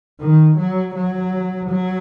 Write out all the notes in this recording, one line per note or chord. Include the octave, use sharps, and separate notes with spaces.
D#3
F#3
F#3
F#3